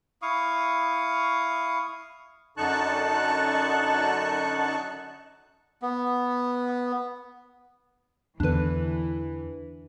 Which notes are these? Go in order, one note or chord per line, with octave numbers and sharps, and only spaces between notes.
E4 F5 C#6 D#6
F#2 D3 D#4 A5 C#6 F#6
B3
E2 D3 E3 D4 B4